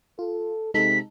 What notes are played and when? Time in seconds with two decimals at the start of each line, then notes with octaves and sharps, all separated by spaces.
0.19 F4 A4
0.74 C3 G#3 D#4 A4 B6